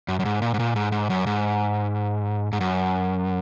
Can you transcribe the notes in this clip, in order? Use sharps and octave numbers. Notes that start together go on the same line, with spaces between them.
F#2
F#2
G#2
A#2
G#2
A#2
G#2
G#2
F#2
G#2
G#2
F#2